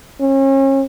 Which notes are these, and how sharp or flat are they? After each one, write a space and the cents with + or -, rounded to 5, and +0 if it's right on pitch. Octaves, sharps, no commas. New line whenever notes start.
C#4 -35